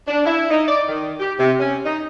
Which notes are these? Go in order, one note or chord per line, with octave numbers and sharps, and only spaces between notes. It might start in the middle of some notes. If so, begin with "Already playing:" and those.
D4
E4
D#4
D5
D#3
G4
C3
C#4
D#4